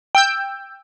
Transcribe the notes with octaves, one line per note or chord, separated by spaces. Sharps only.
G5 E6 G6